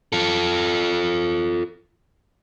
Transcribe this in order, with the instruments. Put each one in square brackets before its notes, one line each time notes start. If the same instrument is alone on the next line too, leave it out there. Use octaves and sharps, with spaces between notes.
[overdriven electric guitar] F4 A4